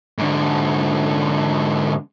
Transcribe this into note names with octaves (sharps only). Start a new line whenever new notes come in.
G#2 D3